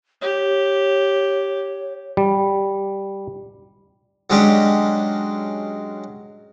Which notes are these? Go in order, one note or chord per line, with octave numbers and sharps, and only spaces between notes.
G4 C#5
G3
F#3 G#3 C#4 D4 G4